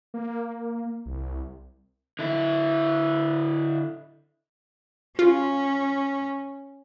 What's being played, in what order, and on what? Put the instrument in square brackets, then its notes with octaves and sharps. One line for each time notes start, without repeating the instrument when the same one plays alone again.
[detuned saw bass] A#3
C2
[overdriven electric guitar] D3 E4
[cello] C#4 [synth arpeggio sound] F4